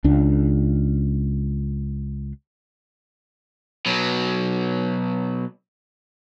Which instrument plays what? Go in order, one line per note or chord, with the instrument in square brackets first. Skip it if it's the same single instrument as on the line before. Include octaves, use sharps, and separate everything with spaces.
[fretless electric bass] C#2 D4
[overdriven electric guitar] B2 F#3